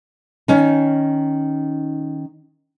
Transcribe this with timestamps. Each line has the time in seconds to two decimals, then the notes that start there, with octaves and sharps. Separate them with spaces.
0.48 D#3 C#4 D#4